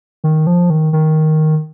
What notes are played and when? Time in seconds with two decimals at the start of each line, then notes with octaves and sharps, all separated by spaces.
0.24 D#3
0.47 F3
0.70 D#3
0.93 D#3